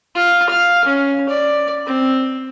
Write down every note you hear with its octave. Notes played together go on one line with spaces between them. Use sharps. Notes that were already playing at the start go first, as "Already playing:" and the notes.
F4
F5
C#4
D5
C4